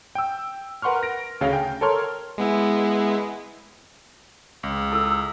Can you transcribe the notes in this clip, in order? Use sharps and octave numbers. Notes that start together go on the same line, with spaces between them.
G5 E6
A#4 B4 F#5 C6 C#6 F6
A#6 D7
D2 C#3 C#4 F5
G5
A4 A#4 C#5 C6 F6
G#3 B3 E4
C#2
E4 A4 E6